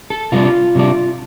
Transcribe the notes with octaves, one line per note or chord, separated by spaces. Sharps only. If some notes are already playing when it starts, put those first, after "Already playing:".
A4
C3 G3 D4 F4
C3 G3 D4